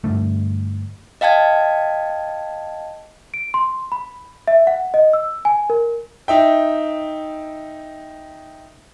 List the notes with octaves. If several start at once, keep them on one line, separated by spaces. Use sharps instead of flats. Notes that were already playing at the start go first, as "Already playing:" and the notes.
G2 D3 A3
D#5 F5 G5 A5 G#6
D7
C6
B5
E5
F#5
D#5
E6
G#5
A#4
D#4 E5 G5